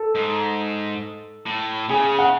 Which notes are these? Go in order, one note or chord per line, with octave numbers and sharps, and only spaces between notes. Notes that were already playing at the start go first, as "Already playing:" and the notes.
Already playing: A4
G#2
A2
C#3 G#4
F#5